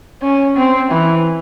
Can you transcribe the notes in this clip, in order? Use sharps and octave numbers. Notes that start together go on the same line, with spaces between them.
C#4
C4
E3